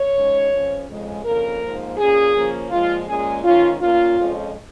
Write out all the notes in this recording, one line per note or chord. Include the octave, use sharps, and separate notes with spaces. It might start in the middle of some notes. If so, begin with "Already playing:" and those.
Already playing: C#5
G#2 G#3 C#4
F2 F3 C#4
F2 C#3 G#3
F2 C#3 A#3 A#4
G#2 F3 A#3
A#2 A#3 C#4 G#4
C#3 F3 A#3 C#4
A#2 F3 G#3 F4
A#2 G#3 C#4 G#4
G#2 D#3 C#4 F4
A#2 A#3 C#4 F4
F2 F3 G#3 C#4